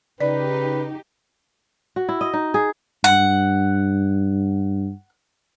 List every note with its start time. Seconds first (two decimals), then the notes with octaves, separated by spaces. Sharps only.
0.20 C#3 D#4 G4 B4 D5
1.96 F#4
2.09 E4
2.21 D#5
2.33 D#4
2.54 G#4
3.04 G2 F#5